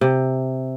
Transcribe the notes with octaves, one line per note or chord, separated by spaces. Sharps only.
C3